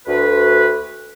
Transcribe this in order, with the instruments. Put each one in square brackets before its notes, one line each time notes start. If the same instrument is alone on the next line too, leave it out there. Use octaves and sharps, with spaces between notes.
[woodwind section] D2 B4